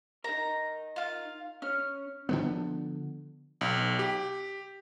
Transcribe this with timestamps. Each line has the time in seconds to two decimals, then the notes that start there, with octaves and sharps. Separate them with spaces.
0.24 D#4 A#4 A#5
0.96 F4 F5
1.62 C#4 C#5 F6
2.29 D3 F3 B3
3.61 B1
3.99 G4